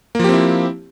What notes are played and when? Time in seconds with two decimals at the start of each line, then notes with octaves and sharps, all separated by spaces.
0.15 A#3
0.19 F3
0.24 G4
0.29 C4
0.34 E4